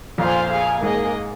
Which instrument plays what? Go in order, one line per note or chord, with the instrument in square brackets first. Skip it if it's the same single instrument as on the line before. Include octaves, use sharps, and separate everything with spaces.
[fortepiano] F2 A#2 [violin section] F4 C5 F5 G#5
[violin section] G#4 F5 G#5
[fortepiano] G#2 [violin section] A#3 G#4 D#5